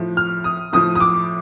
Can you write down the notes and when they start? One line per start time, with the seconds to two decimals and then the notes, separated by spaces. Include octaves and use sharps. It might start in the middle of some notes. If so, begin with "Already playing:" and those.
Already playing: A2 F3
0.17 F6
0.44 D#6
0.73 A2 F3 D#6
0.95 D#6
1.00 D6